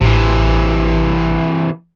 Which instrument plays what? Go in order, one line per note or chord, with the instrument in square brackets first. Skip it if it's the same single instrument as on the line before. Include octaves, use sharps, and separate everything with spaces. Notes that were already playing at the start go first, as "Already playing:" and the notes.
[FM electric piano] A1 [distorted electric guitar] C3 E3